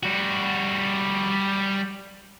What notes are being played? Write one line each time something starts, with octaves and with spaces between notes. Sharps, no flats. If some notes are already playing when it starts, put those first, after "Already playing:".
G3 F#4